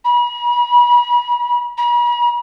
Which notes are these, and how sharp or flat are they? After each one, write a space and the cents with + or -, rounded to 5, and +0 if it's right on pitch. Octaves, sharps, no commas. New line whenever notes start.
B5 -40
B5 -45